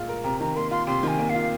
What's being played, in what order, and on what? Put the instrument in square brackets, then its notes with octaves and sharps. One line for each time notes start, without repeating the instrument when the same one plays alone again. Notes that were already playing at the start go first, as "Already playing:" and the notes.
Already playing: [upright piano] A#2 G#3 F4
A#4
[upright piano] C3 [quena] A#5
[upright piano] D#3 [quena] A#5
[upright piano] A#3 [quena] C6
[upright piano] F4 [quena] C6
[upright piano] C3 [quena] C6
[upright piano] D#3 [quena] G#5
[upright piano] A#3
[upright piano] F4 [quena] F5